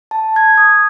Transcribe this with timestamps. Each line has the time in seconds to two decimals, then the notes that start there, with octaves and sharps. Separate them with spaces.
0.11 A5
0.36 G#6
0.58 D#6